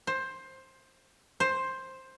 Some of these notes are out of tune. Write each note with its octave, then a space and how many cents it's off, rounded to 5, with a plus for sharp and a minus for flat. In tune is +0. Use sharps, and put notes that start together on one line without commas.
C5 +15
C5 +10